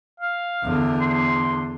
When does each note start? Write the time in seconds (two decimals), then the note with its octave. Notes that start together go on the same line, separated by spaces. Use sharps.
0.20 F5
0.64 E2 D3
1.01 C6